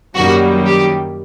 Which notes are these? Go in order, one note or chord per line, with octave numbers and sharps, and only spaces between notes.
F#2 D#3 G3 A#3 F#4
G4